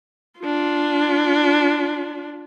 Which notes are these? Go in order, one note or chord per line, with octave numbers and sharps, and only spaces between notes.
D4 F4